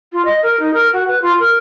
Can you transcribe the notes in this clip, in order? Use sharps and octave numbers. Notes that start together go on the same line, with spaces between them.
F4
D#5
A#4
D#4
A#4
F#4
B4
F4
A#4